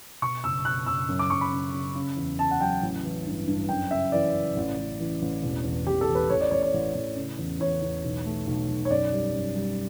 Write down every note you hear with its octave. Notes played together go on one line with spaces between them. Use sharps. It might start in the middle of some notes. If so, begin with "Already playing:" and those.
B2 C#6
F#1 E6
B2 F#6
F#1 E6
F#2
D6
F#2 C#6
B5
C#3
C#3
C#3
E2
C#3 A5
F#5
F#3 G5
A1
E3
G2
G2
F#2 G5
C#3 E5
E3 D5
C#3
A1
A1
E3
A1
E1
E2
E1 G4
A4
E2
B4
A1 C#5
D5
A1 C#5
C#5
A1
A1
C#3
E2
E2 C#5
E2
B1
A3
B1
B1
C#5
F#2 D5
G3
F#2
G3